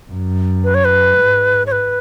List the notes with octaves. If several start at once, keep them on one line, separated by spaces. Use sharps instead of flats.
F#2
B4
C#5
B4
G#2
C#5
B4